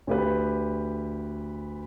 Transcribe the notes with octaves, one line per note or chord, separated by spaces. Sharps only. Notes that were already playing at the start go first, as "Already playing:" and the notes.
D2 G4 B4